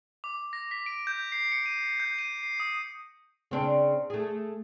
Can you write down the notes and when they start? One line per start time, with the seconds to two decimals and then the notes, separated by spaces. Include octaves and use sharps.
0.24 D6
0.53 A#6
0.71 B6
0.86 D7
1.07 G6
1.32 C7
1.52 C#7
1.66 D#7
2.00 G6
2.19 D#7
2.43 C7
2.60 D#6
3.51 C#3 C4 D4
4.10 A3 G#4